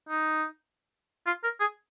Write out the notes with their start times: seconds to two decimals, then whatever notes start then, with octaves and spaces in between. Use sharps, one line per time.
0.09 D#4
1.27 F4
1.44 A#4
1.60 G#4